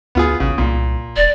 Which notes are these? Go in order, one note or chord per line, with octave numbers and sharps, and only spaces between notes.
D2 B3 F4 G#4
A1 C#3
C2 A#2
D#1 D5